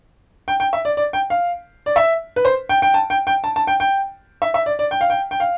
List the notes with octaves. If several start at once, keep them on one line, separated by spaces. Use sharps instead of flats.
G5
G5
E5
D5
D5
G5
F5
D5
E5
B4
C5
G5
G5
A5
G5
G5
A5
A5
G5
G5
E5
E5
D5
D5
G5
F5
G5
G5
F5